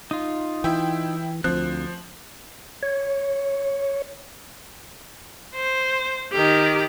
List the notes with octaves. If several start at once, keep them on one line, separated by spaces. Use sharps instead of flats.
D#4 F4
E3 E4 G5
D2 F3 C4 F#6
C#5
C5
D#3 G4